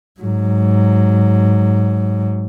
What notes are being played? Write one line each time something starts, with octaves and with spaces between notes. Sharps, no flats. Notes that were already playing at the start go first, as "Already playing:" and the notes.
G#2 F#3